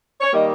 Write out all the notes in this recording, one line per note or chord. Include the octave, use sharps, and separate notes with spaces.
C#5
D#3 G3 A#3 D#5